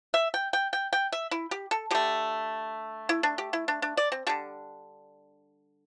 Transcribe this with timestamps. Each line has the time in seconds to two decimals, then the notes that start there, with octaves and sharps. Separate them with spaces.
0.14 E5
0.34 G5
0.53 G5
0.73 G5
0.93 G5
1.12 E5
1.31 E4
1.51 G4
1.71 A4
1.91 D3 A3 G4
3.09 E4
3.23 D4
3.38 G4
3.53 E4
3.68 D4
3.82 D4
3.97 D5
4.12 C4
4.27 D3 G3 D4